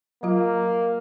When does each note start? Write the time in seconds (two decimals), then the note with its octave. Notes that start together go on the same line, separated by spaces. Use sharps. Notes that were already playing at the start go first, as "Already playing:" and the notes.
0.23 F#3 A#3 F4